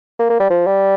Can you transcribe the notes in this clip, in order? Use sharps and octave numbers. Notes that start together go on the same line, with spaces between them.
A#3
A#3
G3
F3
G3